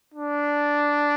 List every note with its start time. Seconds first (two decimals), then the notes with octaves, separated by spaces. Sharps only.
0.14 D4